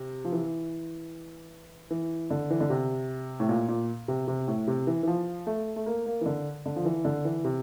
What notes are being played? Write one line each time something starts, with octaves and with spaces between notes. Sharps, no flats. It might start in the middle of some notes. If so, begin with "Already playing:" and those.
Already playing: C3
F3
E3
E3
D3
E3
D3
C3
A2
A#2
A#2
C3
C3
A2
C3
E3
E3
F3
A3
A3
A#3
A#3
E3
D3
D3
F3
E3
D3
E3
C3